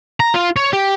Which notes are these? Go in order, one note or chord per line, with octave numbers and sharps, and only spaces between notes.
A#5
F4
C#5
G4